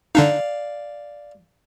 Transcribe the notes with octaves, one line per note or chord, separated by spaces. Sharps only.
D3 D4 D#4 D5 F5